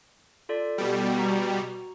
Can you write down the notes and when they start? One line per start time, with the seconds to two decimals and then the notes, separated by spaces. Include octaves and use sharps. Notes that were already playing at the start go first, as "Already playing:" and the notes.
0.49 F4 A4 D5
0.78 B2 G3
1.18 F#4 A#5 C#6